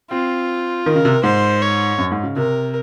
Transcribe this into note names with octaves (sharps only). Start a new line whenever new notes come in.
C4 F4
D#3 A#4
C#3
C3
G#2 C5
C#5
F#2
G#2
C#3
C3 A#4